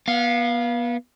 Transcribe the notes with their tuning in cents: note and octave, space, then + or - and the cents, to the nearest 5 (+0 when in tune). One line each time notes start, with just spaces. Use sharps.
B3 -30 F5 +0